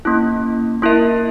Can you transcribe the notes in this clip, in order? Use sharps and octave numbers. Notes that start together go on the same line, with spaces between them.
A#3 C#4 E4
A#3 E4 A#4 E5